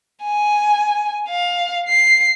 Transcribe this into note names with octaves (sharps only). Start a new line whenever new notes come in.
G#5
F5
C7